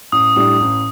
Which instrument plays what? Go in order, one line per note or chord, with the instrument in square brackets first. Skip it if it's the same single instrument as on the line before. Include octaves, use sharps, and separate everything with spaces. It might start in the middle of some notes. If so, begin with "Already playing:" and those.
[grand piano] A1 [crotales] D#6
[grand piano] A2 G3 D4 [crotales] D#6
[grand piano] A1